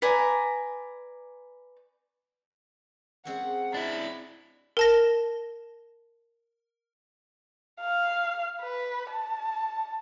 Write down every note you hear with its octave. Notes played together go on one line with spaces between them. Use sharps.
B4 D5 G#5 A#5
G#3 C4 C#4 F#5
D4 E4 B5
A#4 A5 A#6
F5
B4
A5